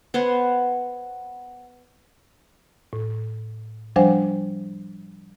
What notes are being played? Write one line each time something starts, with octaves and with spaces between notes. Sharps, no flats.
B3 C5 F#5 G#5
A2
F3 G3 D4 C5 F#5 G#5